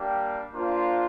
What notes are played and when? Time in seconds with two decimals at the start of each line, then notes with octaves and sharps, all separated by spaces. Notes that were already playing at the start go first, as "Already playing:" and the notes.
Already playing: G3 A#3 D4 G4
0.52 A#3 D4 F4 C5